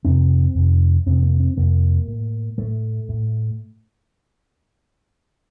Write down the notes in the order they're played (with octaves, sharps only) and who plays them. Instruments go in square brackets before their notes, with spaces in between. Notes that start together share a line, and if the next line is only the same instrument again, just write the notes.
[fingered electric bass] F2 C3 C4
F2 C3
F2 C3 C4
A#3
C4
F2 C3 A#3
A2
A2 A3
A2